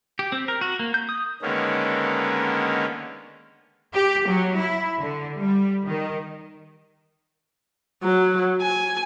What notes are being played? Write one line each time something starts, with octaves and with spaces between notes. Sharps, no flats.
G4
C4
A#4
F#4
A#3
G6
D#6
D3 D#3 G#3 A#3 B3 C#4
G4
F#3
E4
D3
G3
D#3
F#3
G#5